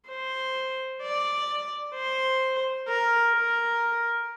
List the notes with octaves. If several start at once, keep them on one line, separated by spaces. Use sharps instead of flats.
C5
D5
C5
A#4
A#4